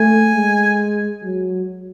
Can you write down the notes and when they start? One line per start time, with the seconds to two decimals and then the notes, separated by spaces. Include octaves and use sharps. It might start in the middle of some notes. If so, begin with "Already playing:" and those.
Already playing: A3 G#5
0.35 G#3
1.23 F#3